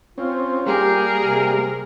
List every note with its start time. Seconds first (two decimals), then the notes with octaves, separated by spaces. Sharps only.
0.18 C4 C#4 F4
0.66 G3 A#3 G4 G#4 A#4
1.23 C3